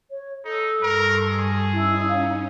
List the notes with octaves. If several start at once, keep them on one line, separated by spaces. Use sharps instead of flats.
C#5
D#4 A4
G2 A#4 C6 C#6
G#4 A5
C#4 D#4 E4
F5